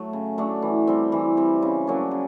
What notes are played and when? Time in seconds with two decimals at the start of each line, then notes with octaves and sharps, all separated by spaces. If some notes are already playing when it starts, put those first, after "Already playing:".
Already playing: F#3 A3
0.13 C#3
0.38 F#3 A3 D4
0.62 E3
0.87 G3 C4
1.12 E3
1.37 G3 C4
1.62 C#3
1.87 F#3 A#3 D4
2.11 C#3